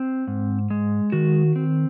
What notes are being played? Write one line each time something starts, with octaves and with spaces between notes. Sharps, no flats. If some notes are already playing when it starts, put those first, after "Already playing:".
Already playing: C4
G#2
G#3
D#3 F#4
C4